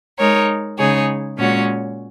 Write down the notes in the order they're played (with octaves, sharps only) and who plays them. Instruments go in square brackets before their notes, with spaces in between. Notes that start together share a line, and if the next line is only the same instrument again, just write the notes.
[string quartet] G#3 D#4 A#4 C#5
C#3 G#3 D#4 G#4 C#5
A#2 G#3 C#4 F#4 C#5